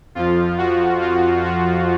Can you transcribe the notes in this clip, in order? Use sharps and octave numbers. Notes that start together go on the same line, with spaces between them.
F2 F3 F4
F#4
F4
F#4